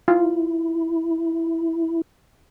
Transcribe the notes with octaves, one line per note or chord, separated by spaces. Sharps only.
E4 F4